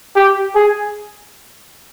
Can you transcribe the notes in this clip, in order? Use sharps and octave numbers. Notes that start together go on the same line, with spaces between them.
G4
G#4